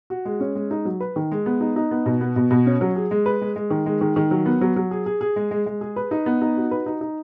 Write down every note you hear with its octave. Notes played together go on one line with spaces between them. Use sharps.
F#4
G#3
C#4
G#3
D#4
F#3
B4
D#3
G#3
B3
D#4
D#4
B3
B2
B3
B2
B2
C#4
F#3
G#4
G#3
B4
G#3
G#3
D#3
G#3
D#3
D#3
F#3
B3
F#3
F#3
G#4
G#4
G#4
G#3
G#3
G#3
G#4
B4
D#4
B3
D#4
F#4
B4
D#4
D#4